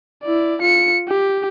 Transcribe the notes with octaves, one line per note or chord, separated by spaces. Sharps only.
E4 D5
F4 C#7
G4